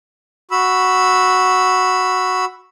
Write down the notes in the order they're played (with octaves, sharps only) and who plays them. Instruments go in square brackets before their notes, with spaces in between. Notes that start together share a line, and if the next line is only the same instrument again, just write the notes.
[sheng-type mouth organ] F#4 B5 E6